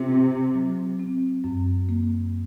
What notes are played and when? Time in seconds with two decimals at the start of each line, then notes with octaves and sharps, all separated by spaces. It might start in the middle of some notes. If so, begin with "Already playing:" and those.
Already playing: C3 F4
0.11 C4
0.55 F#3
1.00 C4
1.44 F#2
1.89 A#3